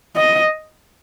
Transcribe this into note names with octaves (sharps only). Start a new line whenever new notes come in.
D#5